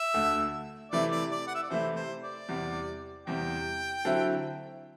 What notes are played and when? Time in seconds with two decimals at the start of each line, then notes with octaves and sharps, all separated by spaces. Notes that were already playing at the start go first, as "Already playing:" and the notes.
Already playing: E5
0.14 D2 D3 A3
0.92 C3 E3 A3 E4 D5
1.12 D5
1.31 D5
1.47 F#5
1.55 E5
1.63 D5
1.70 C3 E3 A3 E4 C5
1.96 C5
2.22 D5
2.48 E2 C3 G3
3.27 E2 C3 G3 G5
4.05 D3 F#3 C4 E4